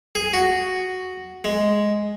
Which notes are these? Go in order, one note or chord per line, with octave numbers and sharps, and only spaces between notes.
G#4
F#4
G#3